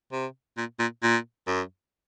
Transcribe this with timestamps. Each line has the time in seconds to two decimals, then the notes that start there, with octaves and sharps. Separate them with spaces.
0.12 C3
0.57 A#2
0.79 A#2
1.03 A#2
1.47 F#2